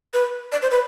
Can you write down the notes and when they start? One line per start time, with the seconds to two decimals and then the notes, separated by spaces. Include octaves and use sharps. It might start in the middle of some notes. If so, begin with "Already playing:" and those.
0.14 B4
0.52 D5
0.62 C5
0.71 B4